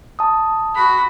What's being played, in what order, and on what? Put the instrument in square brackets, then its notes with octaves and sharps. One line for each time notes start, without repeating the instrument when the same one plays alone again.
[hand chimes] A5 D#6
[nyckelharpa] F#4 B5